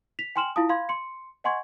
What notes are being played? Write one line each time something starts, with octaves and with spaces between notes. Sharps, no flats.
B6 F7
G5 G#5 C6 F6 E7 F#7
E4 F4 F5 A5 D#6
F5 B5 C6 G#6
C6 C#7
D#5 F#5 G#5 C6 C#6 G#6